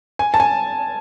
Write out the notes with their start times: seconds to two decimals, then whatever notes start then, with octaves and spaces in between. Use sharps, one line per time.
0.19 G#5
0.34 A5
0.40 G#5